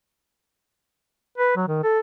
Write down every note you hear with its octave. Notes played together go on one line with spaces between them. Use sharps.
B4
F#3
D#3
A4